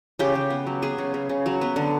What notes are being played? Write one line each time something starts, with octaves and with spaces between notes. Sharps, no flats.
C#3 G4
C#3
B3
F#3
B3 G#4
C#3
C#3
C#3
F#3
B3
D3